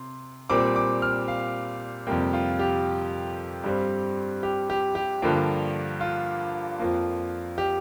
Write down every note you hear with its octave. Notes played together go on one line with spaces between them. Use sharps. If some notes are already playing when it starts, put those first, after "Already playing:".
Already playing: C3 C6
A#2 G3 C4 D6
D6
F6
F5
F2 C3 G3 A#3 G5
F4
G4
G2 G3 C4
G4
G4
G4
G2 D3 F3 A#3
F4
F2 F3 A#3
G4